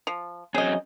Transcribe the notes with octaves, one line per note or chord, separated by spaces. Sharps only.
F3
F#3 C4 C#4 G#4 D#5